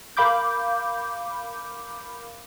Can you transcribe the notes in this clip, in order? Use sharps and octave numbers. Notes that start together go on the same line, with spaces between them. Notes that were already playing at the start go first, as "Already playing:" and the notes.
A#4 F5 B5 D6 G6